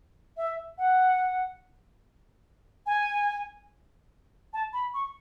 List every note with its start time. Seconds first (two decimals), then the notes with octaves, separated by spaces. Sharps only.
0.37 E5
0.78 F#5
2.86 G#5
4.53 A5
4.73 B5
4.94 C#6